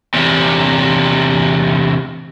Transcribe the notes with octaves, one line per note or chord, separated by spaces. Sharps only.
E2 C3